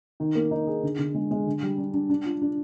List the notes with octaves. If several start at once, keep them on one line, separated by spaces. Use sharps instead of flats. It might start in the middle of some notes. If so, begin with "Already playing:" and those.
D#3
A#3
D#4
G#4
D3
D3
G#3
G#3
D3
G3
D4
D4
D4
F4
D4